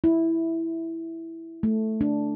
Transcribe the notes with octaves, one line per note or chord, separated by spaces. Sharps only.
E4
A3
D4